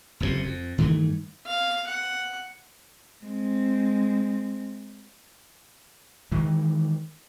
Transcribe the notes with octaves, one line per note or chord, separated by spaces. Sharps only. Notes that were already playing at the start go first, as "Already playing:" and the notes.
F#1 F2 G#2 C3
F2
G2 D#3 E3 A3
F5
F#5
G#3 C4
D#3 E3 G#3